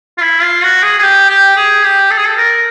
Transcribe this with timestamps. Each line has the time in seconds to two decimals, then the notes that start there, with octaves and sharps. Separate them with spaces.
0.18 F4
0.21 E4
0.42 F4
0.63 F#4
0.82 G#4
0.98 G#4
1.02 G4
1.29 G4
1.56 G#4
1.84 G4
2.10 A4
2.18 G#4
2.25 A4
2.37 A#4